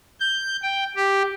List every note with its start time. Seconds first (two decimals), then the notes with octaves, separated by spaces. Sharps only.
0.20 G6
0.63 G5
0.96 G4